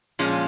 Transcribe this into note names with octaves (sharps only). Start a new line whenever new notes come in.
A#2 F3 G#3 C#4